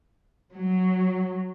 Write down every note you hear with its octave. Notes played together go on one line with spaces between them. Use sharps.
F#3